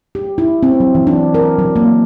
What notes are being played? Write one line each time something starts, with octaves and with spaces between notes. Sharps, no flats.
G4
E4
C4
F#3
E3
D4
A#4
F#3
A#3